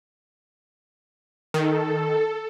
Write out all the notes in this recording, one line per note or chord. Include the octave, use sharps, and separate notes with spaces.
D#3 A4